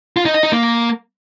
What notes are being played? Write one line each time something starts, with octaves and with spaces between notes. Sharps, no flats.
F4
D#4
D#5
D#4
A#3